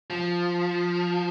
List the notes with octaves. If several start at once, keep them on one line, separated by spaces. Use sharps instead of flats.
F3